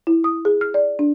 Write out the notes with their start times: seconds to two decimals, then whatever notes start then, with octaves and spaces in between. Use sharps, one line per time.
0.07 E4
0.24 D#6
0.45 G#4
0.61 F6
0.74 D5
0.99 D4